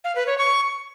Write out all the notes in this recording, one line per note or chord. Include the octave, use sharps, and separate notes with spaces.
F5
B4
C#5
C#6